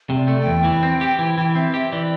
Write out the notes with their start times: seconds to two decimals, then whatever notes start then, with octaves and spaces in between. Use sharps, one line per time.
0.10 C3
0.16 D5
0.28 A3
0.41 G5
0.46 E2
0.64 E3
0.83 C4
1.01 G4
1.19 E3
1.38 E3 G5
1.55 C4 E5
1.74 G4 E5
1.91 E3 D5